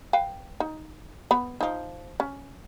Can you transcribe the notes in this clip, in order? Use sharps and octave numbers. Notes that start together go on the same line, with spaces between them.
B4 F5 G5
D#4
B3 B5
F3 D#4
C#4